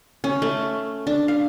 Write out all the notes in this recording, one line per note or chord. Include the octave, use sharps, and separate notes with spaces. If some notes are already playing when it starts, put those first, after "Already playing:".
C#4
A3
D4
F5